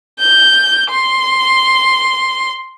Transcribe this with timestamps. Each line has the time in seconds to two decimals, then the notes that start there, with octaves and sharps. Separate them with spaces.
0.20 G6
0.90 C6